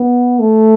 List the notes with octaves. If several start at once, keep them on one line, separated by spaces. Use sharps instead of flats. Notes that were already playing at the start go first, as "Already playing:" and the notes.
Already playing: B3
A3